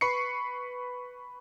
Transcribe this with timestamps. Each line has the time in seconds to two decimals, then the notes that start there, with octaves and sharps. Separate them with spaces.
0.01 B4 B5 C#6 C7 C#7